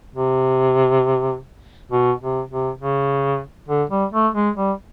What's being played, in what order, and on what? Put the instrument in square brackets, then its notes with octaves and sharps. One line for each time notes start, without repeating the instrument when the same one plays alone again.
[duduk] C3
B2
C3
C3
C#3
D3
G3
A3
G#3
G3